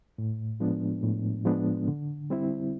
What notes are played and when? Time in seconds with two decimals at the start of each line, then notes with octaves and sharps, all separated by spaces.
0.18 A2
0.60 F3 G#3 B3 D4
1.03 A2
1.45 F3 G#3 B3 D4
1.88 D3
2.30 G3 C4 E4